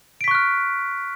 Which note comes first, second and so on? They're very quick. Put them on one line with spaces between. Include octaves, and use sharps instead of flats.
D7 B6 C#6 F#6 F6